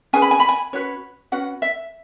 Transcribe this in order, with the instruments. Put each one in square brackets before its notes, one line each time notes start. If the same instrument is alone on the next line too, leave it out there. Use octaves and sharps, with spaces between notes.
[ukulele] C#4 G#4 B4 G#5
B5
G#5
B5
G#5
C#4 F#4 B4 C#5
C#4 F#4 B4 F#5
E5